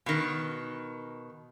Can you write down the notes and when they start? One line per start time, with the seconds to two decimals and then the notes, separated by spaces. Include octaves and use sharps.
0.06 B2 D#3